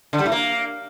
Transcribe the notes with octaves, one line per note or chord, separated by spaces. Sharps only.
D3
G3
A2
A#3